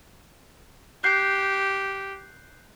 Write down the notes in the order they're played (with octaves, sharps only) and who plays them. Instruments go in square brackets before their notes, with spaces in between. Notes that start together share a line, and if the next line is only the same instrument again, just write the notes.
[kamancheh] G4 [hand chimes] F#6 G6 C7